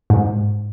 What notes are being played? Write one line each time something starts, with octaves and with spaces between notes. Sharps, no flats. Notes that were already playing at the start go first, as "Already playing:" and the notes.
G#2